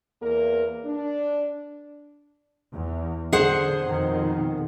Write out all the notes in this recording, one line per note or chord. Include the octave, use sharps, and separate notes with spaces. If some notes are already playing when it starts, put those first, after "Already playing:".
E2 A#3 A#4
D4
E2
D3 G#4 C5 F#5
F2 B2 D#3